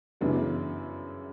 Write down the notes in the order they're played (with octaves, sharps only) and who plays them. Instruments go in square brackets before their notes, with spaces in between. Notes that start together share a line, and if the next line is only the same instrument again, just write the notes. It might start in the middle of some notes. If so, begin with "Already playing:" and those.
[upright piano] F#2 C#3 E3 B3 D4